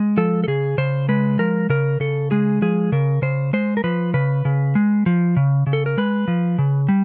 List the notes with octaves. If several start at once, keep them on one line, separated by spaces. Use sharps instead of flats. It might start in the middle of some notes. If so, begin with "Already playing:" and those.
Already playing: G#3
F3 A4
A4
C#3 G#4
C#3 C5
G#3 B4
F3 A#4
C#3 A#4
C#3 A4
G#3 G#4
F3 G#4
C#3 A#4
C#3 C5
G#3 C5
A#4
F3 B4
C#3 B4
C#3
G#3
F3
C#3
C#3
A4
A#4
G#3 B4
F3
C#3
G3